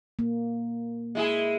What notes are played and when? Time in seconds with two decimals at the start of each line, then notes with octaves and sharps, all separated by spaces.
0.19 A#3
1.15 G#3 E4 G#4